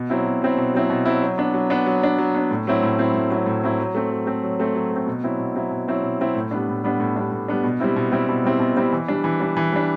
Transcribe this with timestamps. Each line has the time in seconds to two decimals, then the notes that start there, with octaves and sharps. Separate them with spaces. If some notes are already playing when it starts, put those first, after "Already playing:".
Already playing: B2
0.10 F#3 C4 E4
0.26 B2
0.42 F#3 C4 E4
0.58 B2
0.74 F#3 C4 E4
0.90 B2
1.05 F#3 C4 E4
1.22 F#3
1.38 B3 D4
1.54 F#3
1.70 B3 D4
1.86 F#3
2.02 B3 D4
2.18 F#3
2.34 B3 D4
2.51 A2
2.67 F#3 C4 E4
2.83 A2
2.98 F#3 C4 E4
3.14 A2
3.30 F#3 C4 E4
3.46 A2
3.63 F#3 C4 E4
3.79 F#3
3.95 A3 C4
4.11 F#3
4.26 A3 C4
4.43 F#3
4.60 A3 C4
4.75 F#3
4.91 A3
4.96 C4
5.07 B2
5.24 F#3 C4 E4
5.39 B2
5.55 F#3 C4 E4
5.71 B2
5.88 F#3 C4 E4
6.03 B2
6.20 F#3 C4 E4
6.36 A2
6.51 G3 B3 D4
6.68 A2
6.84 G3 B3 D4
7.00 A2
7.16 G3 B3 D4
7.31 A2
7.48 G3 B3 D4
7.64 B2
7.80 G3 C4 E4
7.96 B2
8.12 G3 C4 E4
8.29 B2
8.44 G3 C4 E4
8.60 B2
8.77 G3 C4 E4
8.92 E3
9.08 G3 D4
9.24 E3
9.40 G3 D4
9.57 E3
9.72 G3 D4